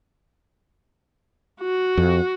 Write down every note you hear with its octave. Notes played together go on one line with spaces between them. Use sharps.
F#4
F2